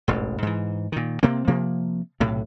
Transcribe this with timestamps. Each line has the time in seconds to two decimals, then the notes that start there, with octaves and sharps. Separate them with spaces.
0.08 E1 A1 G#2
0.42 G#2 E3
0.92 A#2 D#3
1.23 C3 A#3 C4
1.48 C3 F3 A#3
2.20 B1 A2 C3